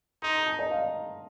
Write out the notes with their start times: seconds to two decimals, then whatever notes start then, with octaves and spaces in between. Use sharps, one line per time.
0.22 D#4 C6
0.35 A#5
0.47 A5
0.59 D#5
0.71 F5